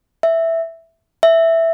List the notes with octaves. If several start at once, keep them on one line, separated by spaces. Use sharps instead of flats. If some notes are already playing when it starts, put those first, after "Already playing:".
E5
E5